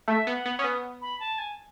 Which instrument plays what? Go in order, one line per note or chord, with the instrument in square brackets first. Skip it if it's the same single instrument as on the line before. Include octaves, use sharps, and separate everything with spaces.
[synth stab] A3 [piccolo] E5
[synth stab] B3
[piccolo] F#5
[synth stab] B3
[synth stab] C#4 [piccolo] D#6
[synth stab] B3
[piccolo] B5
A5
G#5